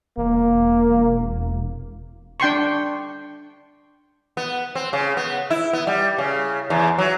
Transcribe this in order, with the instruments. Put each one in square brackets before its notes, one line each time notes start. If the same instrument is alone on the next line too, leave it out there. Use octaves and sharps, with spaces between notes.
[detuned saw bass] E1 [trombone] A#3
[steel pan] D4 G5 C6 C#6
[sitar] B3
C4
C#3
B3
E4
B3
G3
C#3
E2
F#3